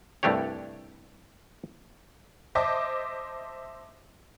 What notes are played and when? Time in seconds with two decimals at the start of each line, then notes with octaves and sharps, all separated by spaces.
0.23 C2 G2 A3 D4 G4 C#5
2.55 C5 D#5 E5 A5 D6